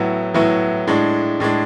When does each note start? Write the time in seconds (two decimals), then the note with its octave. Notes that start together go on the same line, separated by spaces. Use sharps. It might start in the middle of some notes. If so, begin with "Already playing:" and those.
Already playing: A2 F#3 B3 E4
0.34 A2 F#3 B3 E4
0.87 A2 G#3 D4
1.40 A2 G#3 D4